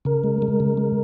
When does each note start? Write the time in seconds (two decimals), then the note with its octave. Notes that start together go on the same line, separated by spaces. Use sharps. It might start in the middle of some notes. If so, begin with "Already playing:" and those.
0.05 C#3 A#4
0.24 G#3
0.42 G#3
0.60 C#3
0.77 G#3